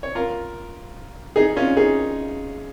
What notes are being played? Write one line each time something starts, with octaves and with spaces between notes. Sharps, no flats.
C#5
F4 A#4
D#4 G#4
C#4 F4
D#4 G#4